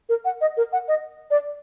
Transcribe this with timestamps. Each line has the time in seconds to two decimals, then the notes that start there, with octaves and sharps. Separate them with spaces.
0.09 A#4
0.25 F#5
0.41 D#5
0.57 A#4
0.73 F#5
0.88 D#5
1.31 D5